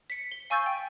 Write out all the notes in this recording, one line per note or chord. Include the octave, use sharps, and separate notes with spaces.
B6 C#7
G7
F5 G#5 C#6 E6 G6 A6
G5